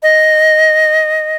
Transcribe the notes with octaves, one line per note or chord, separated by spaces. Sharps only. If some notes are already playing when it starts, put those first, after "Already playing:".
D#5